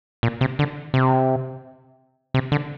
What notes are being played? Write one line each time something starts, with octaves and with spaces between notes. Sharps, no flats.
A#2
C3
D3
C3
C3
D3